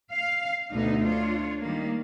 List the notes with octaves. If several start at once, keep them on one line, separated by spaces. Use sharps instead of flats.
F5
D2 B2 D3 D#4
D4 F4 C#5
D#3 G3 A#3